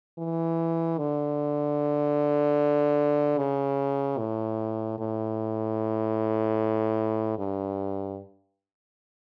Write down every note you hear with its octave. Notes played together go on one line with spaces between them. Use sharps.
E3
D3
C#3
A2
A2
G2